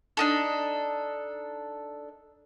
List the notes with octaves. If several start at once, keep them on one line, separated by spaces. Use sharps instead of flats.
D4 D#4 A4